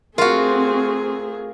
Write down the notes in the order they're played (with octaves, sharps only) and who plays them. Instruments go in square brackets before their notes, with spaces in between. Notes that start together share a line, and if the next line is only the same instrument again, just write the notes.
[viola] A3 G#4 [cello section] C4 [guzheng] F4 F#4 [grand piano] A#4 F5